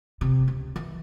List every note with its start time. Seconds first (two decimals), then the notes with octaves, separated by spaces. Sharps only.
0.21 C3
0.48 C#2
0.76 E3